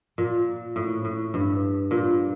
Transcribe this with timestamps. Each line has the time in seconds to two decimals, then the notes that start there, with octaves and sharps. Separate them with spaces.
0.18 A#2
0.76 A2
1.05 A2
1.34 G2
1.91 A#2